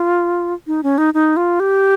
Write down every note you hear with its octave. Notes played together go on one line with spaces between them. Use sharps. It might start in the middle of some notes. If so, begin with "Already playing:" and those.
Already playing: F4
D#4
C#4
D#4
D#4
F4
G4